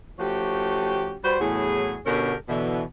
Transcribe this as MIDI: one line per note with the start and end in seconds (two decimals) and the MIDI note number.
0.19 1.17 53
0.19 1.17 57
0.19 1.17 61
0.19 1.17 66
0.19 1.17 67
1.24 1.37 55
1.24 1.37 66
1.24 1.37 71
1.24 1.37 72
1.41 1.99 40
1.41 1.99 45
1.41 1.99 54
1.41 1.99 68
2.06 2.34 47
2.06 2.34 50
2.06 2.34 61
2.06 2.34 67
2.06 2.34 69
2.06 2.34 70
2.49 2.82 47
2.49 2.82 50
2.49 2.82 52